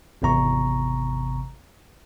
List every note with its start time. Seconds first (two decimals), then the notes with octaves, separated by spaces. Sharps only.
0.22 G#1 E2 C3 A#5 C#6